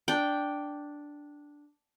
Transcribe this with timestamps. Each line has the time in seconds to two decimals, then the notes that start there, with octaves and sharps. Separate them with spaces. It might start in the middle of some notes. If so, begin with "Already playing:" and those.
0.08 D4 G5